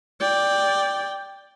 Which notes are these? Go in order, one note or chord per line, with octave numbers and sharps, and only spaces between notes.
D5 G5